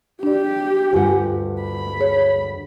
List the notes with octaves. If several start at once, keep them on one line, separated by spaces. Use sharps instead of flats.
D4 F#4 G4 D5
D2 G2 F4 F#5 G#5
B5
G#4 C#5